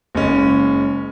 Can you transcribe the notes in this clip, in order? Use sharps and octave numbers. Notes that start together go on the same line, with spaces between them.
F#1 G#3 C#4